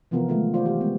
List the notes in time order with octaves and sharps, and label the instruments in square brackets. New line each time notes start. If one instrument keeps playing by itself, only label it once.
[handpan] C3 E3 F3 B3 F4 A#4
D#3 F#3 G#3 A3 D#4 F4
F4 F#4 C5 D5
E3 G3 G4 C5 D5
G3 G#3 A#3 B3